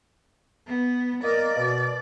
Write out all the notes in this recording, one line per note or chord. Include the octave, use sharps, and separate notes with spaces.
B3
A#3 A#4 D5 D#5
B2